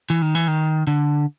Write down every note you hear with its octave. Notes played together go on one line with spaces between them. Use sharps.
E3
D#3
E3
D#3
D3